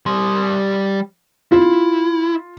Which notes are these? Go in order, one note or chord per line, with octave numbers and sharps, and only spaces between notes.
G3 C6
E4 F4